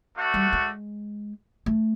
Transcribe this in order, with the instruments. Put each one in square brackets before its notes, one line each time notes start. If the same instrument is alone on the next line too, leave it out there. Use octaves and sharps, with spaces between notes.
[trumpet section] A3 D4 F#4
[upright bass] G3
G#3
A3